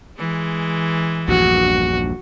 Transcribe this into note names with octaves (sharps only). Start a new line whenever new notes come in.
E3 G#3
A#1 E2 G2 F#4